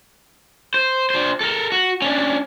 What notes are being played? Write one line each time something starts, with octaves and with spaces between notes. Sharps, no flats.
C5
D4 C5
A4 A#4
F#4
C#4 D4